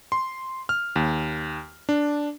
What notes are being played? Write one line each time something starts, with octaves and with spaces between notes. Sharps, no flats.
C6
F6
D#2
D4